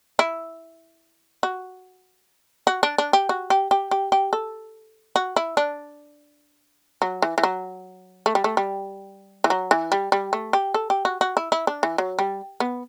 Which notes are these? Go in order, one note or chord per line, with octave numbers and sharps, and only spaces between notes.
E4
F#4
F#4
D4
D4
G4
F#4
G4
G4
G4
G4
A4
F#4
E4
D4
F#3
E3
E3
F#3
A3
G3
A3
G3
E3
F#3
E3
G3
G3
A3
G4
A4
G4
F#4
F#4
E4
E4
D4
E3
F#3
G3
B3